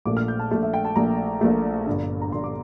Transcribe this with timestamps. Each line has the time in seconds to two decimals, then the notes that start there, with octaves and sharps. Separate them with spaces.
0.06 A#1 A#2 A3 D6
0.17 F6
0.28 G6
0.39 A5
0.51 A#1 A#2 A3 A5
0.62 E5
0.74 G5
0.85 A5
0.96 A#1 A#2 A3 A#5
1.41 A#1 A#2 A3
1.86 G1 G2 D3
2.21 A#5
2.32 G1 G2 D3 C6
2.44 D6